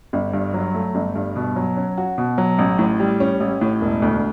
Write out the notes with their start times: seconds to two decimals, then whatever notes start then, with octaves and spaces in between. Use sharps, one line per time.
0.13 G1
0.34 G2
0.54 F#3
0.74 A3
0.95 G1
1.16 G2
1.36 B2
1.56 F#3
1.77 C#4
1.98 F#4
2.18 B2
2.38 F#3
2.59 A1
2.79 A2
3.00 G3
3.20 C#4
3.40 A1
3.61 A2
3.81 E1
4.02 D2